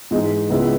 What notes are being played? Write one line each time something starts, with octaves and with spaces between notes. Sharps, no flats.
G#2 E3 G#3 D#4
C#2 C#3 G#3 B3 E4